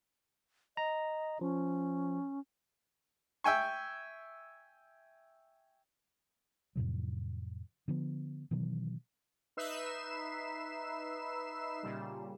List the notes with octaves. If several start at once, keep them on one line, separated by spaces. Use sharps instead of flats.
D#5 A#5
F3 C#4
E5 G5 G#5 C#6
F2 A2 C3 F#3
D3 F3 B3
B2 D#3 E3 F#3
D#4 B4 E5 C7 E7
A#2 C#3 G3